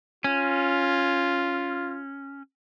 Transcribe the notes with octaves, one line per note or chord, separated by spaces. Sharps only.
C#4 F4